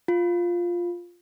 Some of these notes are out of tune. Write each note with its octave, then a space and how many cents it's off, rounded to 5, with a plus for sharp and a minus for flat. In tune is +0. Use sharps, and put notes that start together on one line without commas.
F4 +0